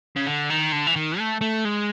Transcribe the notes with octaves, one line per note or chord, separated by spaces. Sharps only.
C#3
D3
D#3
D3
E3
D#3
A3
A3
G#3